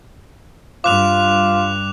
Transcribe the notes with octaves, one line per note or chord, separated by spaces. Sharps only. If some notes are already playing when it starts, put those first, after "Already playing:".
G2 F4 D6 F#6 F7